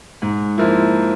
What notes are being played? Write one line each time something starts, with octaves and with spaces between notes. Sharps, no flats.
G#2
F3 A#3 E4